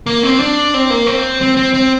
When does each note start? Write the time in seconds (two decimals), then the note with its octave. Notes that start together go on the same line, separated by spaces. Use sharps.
0.06 A#3
0.23 C4
0.40 D4
0.74 C4
0.90 A#3
1.06 C4
1.41 C4
1.57 C4
1.74 C4